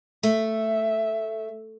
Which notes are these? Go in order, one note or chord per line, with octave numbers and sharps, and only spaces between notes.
A3 E5